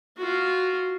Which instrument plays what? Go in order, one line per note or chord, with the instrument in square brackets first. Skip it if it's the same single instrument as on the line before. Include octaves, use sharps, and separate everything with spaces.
[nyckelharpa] F4 F#4